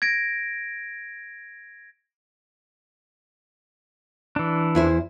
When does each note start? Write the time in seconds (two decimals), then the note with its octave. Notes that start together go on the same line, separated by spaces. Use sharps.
0.02 G#6 A#6 D7
4.36 E3 D4
4.75 E2 E4 C5